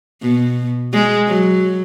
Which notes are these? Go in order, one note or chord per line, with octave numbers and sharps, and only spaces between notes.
B2
G#3
F#3